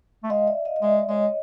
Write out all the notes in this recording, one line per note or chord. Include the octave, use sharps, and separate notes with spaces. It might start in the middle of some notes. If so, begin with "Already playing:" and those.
A3
G#3 D#5 F5
D5 E5
D#5 F5
D#5
G#3 D5 E5
G#3 C#5 D#5